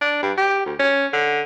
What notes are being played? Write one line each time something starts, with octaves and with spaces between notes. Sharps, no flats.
D4
G2
G4
D2
C#4
D3